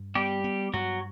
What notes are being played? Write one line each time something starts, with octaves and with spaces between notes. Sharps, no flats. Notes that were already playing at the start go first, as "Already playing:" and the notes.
Already playing: G2
G3 B3 G4
B3
G2 F#3 F#4